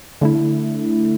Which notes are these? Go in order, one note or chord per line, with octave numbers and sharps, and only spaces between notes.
D3 A3 E4